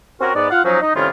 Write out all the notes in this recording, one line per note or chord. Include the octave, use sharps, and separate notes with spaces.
C4 C#4 F#4 A#4
G#2 B3 D5
F4 F5 F#5
F3 F#3 C#4 D#4
D#4
A2 C3 D#3 G3 C#4 F4